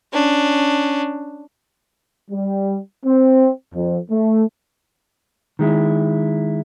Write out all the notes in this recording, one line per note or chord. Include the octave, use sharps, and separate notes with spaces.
C#4 D4
G3
C4
F2
A3
D#3 G#3 E4